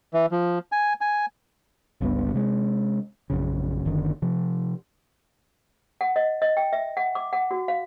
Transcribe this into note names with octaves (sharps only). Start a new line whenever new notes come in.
E3
F3
G#5
G#5
G1 C#2 G2 B3
C3 G#3
A#1 F#2 C#3
F#1 F#2 D3 D#3
C3 F3
F#5
D#5
D#5
G5
E5
F#5
D6
F#5
F#4
F5